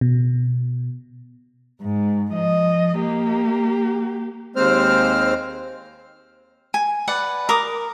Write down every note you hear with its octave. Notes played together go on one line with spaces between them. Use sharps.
B2
G#2
F3 D#5
A#3 G4
D#2 G#3 C4 C5 F6
G#5
B4 D5 F#5
A#4 D6 D#6